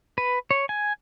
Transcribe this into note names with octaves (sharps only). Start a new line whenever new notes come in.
B4
C#5
G#5